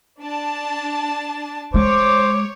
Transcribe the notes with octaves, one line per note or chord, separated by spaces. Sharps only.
D4 A5
G#3 C5 C#5 D6